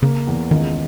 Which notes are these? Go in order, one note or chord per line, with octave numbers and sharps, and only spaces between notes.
C#3 A#3
E2
C#2 D#3